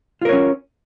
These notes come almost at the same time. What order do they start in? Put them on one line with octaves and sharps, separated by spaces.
F4 A#4 C#5 C#4